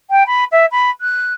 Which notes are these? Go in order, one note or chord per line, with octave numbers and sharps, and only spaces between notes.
G5
B5
E5
B5
F#6